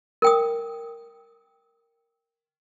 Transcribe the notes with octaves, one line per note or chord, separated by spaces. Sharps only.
A#4 G5 D#6